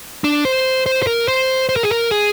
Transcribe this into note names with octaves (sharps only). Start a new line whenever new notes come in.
D4
C5
C5
C5
A#4
C5
C5
A#4
G#4
A#4
G#4